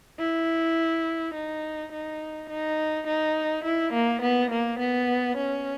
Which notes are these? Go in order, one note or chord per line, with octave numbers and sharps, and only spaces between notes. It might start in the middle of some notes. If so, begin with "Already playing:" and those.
E4
D#4
D#4
D#4
D#4
E4
A#3
B3
A#3
B3
C#4